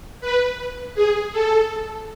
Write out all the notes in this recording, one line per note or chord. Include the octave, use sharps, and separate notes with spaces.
B4
G#4
A4